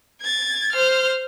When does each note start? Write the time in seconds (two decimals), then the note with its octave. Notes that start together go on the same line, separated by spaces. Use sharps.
0.21 G#6 A6
0.73 C5 F6